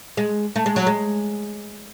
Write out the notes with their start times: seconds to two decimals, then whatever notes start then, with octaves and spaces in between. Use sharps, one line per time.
0.17 G#3
0.56 A3
0.66 G#3
0.76 F#3
0.87 G#3